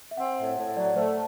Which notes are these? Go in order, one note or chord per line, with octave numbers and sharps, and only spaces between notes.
E5
C4 F#5
A2
F#5
A2
F#3 D5
A3 C5